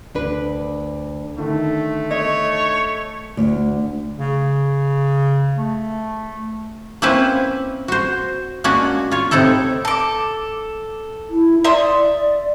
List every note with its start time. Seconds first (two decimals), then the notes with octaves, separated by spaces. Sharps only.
0.15 D2 D4 B4
1.38 D3 D#3 A3
2.11 C#5 D#5
3.37 D2
4.19 C#3
5.57 A3
7.02 A#3 C4 C#4 E4 B4 C5
7.88 F#4 C5
8.64 G#3 A#3 C#4 D4 F#4
9.11 F4 C#5
9.31 A2 C3 D#4 E4 A4
9.85 A4 D6
11.30 E4
11.64 D5 E5 C6 D#6